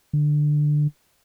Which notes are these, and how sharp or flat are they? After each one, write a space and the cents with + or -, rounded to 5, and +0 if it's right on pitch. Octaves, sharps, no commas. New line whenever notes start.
D3 +15